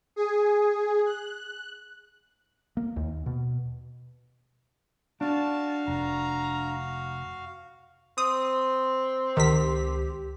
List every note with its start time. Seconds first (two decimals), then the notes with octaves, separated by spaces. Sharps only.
0.16 G#4
1.06 F#6
2.77 A#3
2.96 D#2
3.26 B2
5.21 D4 F#4 F5 A5
5.88 F1 A#5
8.18 C4 D#6
9.37 C#2 D#3 G4 B6